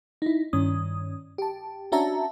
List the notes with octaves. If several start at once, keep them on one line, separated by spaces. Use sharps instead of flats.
D#4 E4
G2 D#3 C#4 D#6
G4 A5
C#4 D4 F#4 E5 A5 A#5